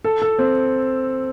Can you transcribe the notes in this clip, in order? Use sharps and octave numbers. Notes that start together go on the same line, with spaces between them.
A4
A4
C4